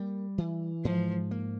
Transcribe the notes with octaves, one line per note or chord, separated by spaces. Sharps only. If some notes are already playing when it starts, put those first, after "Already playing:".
Already playing: G3 A#3
E3
G#2 F3
A#3